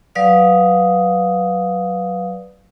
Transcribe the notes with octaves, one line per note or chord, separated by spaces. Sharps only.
F#3 B4 D5 F5 D#6